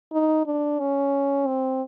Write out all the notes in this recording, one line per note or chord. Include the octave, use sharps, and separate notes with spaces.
D#4
D4
C#4
C4